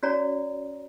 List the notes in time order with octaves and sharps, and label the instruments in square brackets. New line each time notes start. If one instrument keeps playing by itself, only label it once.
[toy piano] C#4 F#4 C#5 D5 A#5